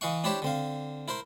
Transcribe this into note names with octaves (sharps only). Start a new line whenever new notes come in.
E3 D#5 F5 F#5 C#6
D4 E4 G4 C5 C#5 E5
D3 C4 F5
E4 A#4 C5 C6